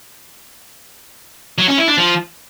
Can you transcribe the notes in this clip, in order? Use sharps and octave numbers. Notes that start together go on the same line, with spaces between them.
F#3
C#4
E4
D4
F3